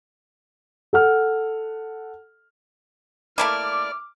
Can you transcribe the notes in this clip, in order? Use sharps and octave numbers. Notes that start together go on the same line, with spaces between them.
A4 F#5 F6
A3 A#3 E4 D5 D6 F6